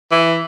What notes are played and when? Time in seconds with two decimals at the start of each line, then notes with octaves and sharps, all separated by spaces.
0.11 E3